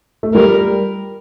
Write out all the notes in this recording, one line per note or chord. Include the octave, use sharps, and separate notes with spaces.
A3
G3 A#4